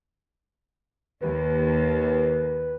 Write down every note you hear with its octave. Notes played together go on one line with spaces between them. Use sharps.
D#2 B4